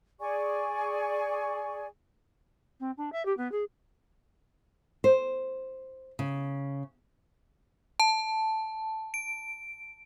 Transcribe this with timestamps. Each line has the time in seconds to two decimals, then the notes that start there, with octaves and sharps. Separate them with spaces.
0.20 G#4 D5 G#5 C#6
2.80 C4
2.97 D4
3.12 E5
3.25 G4
3.37 B3
3.52 G#4
5.04 C5
6.19 C#3
8.00 A5
9.14 D7